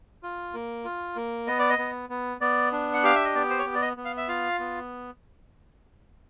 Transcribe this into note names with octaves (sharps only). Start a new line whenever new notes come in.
F4
A#3
F4
A#3
B3 D#5
D5
D#5
B3
B3
B3 D5
D4
F#5
G4 F5
E5
D#5
B3 D5
C5
C#5
B3
D5
D#5
B3
F5
E5
F4 F5
B3